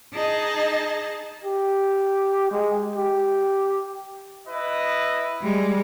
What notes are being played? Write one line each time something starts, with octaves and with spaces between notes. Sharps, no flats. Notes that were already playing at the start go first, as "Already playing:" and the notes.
D#4 G#4 D#5 A5
G4
G#3
G4
E4 B4 D#5
G3 G#3